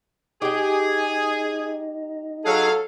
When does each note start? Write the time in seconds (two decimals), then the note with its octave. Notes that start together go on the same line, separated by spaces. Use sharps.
0.42 D#4 G4 G#4 G5
2.45 F#3 G#4 A4 F5